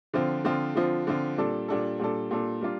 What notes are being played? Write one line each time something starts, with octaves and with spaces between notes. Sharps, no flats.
D3 F3 C4 F4
D3 F3 C4 F4
D3 F3 C4 F4
D3 F3 C4 F4
A#2 G3 D4 A4
A#2 G3 D4 A4
A#2 G3 D4 A4
A#2 G3 D4 A4
G3 A#3 D4 F4